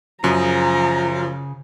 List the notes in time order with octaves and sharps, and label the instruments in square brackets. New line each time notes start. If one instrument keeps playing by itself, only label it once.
[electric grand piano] F#2 [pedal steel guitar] C#3 G#4 [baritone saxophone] F3 [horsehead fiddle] A#5